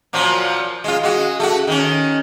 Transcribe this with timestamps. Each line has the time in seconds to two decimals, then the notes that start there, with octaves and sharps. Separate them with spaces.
0.13 A#2 F3 F#3
0.84 G#3 F4
1.03 G#3 F#4
1.40 A3 F#4
1.67 D#3 C#4